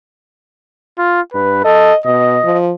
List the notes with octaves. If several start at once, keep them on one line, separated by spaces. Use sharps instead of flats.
F4
G2 B4
A4 D#5
B2 D#5
F3